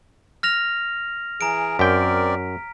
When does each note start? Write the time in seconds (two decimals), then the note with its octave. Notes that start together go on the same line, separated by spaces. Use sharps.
0.43 F6 A#6 F7
1.41 E3 G#4 A#5 D7
1.79 F#2 C4 A#4 D5 G5 B6